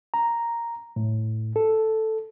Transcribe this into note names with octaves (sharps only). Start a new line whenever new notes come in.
A#5
A2
A4